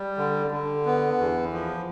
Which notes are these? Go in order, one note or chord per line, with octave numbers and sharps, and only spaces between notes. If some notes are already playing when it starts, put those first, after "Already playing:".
Already playing: G3
D3
D3
B3
E2
F3